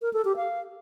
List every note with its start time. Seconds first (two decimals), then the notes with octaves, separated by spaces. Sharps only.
0.02 A#4
0.13 A4
0.25 G4
0.36 F5